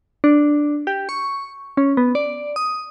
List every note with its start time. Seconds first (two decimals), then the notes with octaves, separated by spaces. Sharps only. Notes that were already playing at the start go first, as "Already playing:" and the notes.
0.24 D4
0.87 G4
1.09 C#6
1.77 C#4
1.97 B3
2.15 D5
2.56 D#6